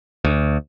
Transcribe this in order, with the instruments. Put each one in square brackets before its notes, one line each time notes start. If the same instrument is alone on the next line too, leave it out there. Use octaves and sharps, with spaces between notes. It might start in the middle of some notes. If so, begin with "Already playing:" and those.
[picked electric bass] D2